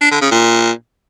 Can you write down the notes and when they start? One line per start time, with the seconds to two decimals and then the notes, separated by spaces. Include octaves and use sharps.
0.02 D4
0.11 D3
0.21 C#3
0.31 A#2